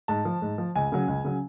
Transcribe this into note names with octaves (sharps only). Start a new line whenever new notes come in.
G#2 A5
F3
G#2
F3
C#2 G#5
C#3 F#3
C#2
C#3 F#3